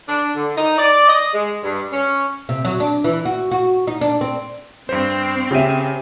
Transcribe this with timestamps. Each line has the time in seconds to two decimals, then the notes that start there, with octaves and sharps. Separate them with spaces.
0.08 D4
0.35 D3
0.56 D#4
0.78 D5
1.08 D#5
1.33 G#3
1.64 G2
1.92 C#4
2.49 C3
2.65 F#3
2.80 D4
3.04 E3
3.25 F#4
3.51 F#4
3.87 D#4
4.01 D4
4.21 C4
4.89 G2 C4 C5
5.51 C#3 G4 E5 D#7